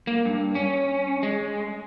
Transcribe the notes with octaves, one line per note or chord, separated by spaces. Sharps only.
A#3
G2
C#4
G#3